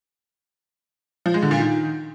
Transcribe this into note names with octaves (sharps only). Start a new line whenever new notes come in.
F3
G#3
D3
A#2
D#3